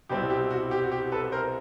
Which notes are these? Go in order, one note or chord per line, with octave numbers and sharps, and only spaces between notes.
C2 B2 G3 C4 E4 G4
G4
F#4
G4
F#4
G4
A4 B4
A#4 C5